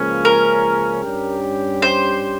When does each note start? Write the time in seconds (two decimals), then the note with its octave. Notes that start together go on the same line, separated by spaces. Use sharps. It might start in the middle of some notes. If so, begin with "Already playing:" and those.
Already playing: C#2 C#3 F3 A#3 C#4
0.25 A#4
1.03 G2 G3 C#4 G4
1.82 C5